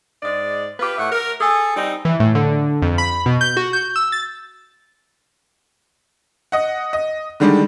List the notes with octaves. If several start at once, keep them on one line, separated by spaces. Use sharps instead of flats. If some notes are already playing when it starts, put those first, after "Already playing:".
G#2 G#3 D5
F4 G4 B4
A2 A3 E5 F#5
A#4
G#4 A4
G3 C4 D#4
E3
A2
D3
F2
B5
B2
G6
F#4
G6
E6
A6
D#5 F#5
D#5
D3 D#3 G3 G#3 D4